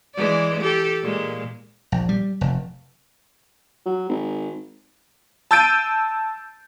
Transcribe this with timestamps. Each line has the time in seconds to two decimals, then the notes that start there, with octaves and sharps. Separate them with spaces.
0.15 E3 G#3 D5
0.62 G4 A4
1.02 A#2 G#3
1.92 A#1
2.09 G3
2.41 F1
3.86 F#3
4.09 G#1
5.51 A5 E6 G6 A6 D7 D#7